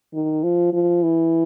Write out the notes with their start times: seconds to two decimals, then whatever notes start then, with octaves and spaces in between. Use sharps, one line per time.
0.14 D#3
0.43 F3
0.73 F3
1.03 E3